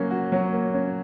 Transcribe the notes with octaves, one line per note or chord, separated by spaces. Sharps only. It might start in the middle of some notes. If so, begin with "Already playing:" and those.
Already playing: F#3 A#3 C#4 F#4
F#4
F#3
A#3
C#4